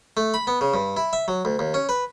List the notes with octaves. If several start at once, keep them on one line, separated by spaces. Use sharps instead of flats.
A3
B5
B3
C#3
G2
E4
E5
F#3
D2
D#2
C#4
B4